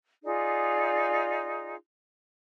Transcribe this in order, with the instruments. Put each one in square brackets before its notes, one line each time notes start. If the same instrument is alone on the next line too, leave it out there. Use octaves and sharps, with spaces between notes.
[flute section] D#4 F4 G#4 D5